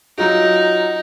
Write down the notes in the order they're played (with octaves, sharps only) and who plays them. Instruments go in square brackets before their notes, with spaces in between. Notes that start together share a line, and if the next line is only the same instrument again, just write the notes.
[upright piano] F#3 F4 F#4 [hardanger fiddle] D#4